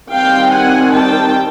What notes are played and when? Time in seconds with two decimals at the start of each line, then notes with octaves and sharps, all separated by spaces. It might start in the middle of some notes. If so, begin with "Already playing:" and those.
0.11 D#3 G3 C4 F5 G5
0.53 F#5 G#5
0.93 G5 A5